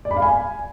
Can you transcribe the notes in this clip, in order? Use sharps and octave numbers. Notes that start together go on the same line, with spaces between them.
D5
B5
F5
G#5